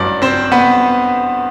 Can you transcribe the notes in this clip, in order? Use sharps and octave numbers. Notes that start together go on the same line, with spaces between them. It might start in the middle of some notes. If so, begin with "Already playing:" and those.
Already playing: A1 G2 F#3 D4 D5
C4 C5
B3 B4